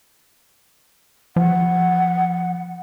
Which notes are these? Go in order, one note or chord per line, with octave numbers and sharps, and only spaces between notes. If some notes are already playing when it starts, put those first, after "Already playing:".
F3 F#5